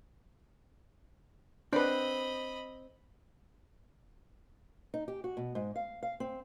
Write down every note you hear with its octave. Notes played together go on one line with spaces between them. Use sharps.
C4 D4 B4 D#5 B5
D#4
G4
F#4
B2
G#2
F5
F5
C4